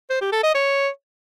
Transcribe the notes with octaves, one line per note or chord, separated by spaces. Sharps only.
C5
G4
A4
D#5
C#5